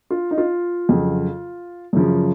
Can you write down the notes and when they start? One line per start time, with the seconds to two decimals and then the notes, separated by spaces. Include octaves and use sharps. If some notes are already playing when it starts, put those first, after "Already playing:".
0.10 F4
0.31 D#4
0.38 F4
0.89 F2 C#3 F#3
1.93 F#2 C#3 F3